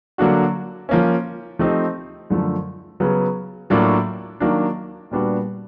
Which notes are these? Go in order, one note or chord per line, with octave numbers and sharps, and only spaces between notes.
D3 F#3 A#3 D4 F#4
F3 A#3 C#4
F3 A3 C4 D#4 G4
F#2 D3 F3 A3
C#3 F#3 B3
A2 F#3 A#3 D4 F4
D#3 F#3 A#3 D4
A#2 G3 B3 D4 F#4